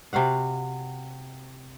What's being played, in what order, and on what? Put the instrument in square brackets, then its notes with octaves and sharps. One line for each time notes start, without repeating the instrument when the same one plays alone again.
[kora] C3 F#4 F5 F#5